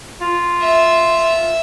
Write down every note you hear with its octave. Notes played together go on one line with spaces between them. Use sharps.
F4
E5